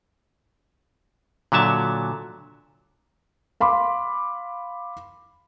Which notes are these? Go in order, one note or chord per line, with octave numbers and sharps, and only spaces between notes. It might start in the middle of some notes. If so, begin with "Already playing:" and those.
A#2 D3 F#3 E5 A5
F5 B5 C6 D6